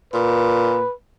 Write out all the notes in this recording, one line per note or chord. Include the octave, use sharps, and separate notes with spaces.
A#2 B4